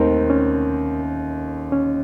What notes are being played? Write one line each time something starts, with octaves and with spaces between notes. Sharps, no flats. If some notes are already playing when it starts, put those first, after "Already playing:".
Already playing: D#2 D#3 A3 C4 D#4 A#4 C5
C#4
C#4